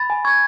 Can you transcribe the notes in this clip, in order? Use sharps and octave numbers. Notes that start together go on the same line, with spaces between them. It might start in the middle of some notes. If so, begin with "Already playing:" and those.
Already playing: B5 A6
G#5
C#6 G#6